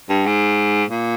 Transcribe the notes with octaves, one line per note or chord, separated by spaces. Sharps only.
G2
G#2
A#2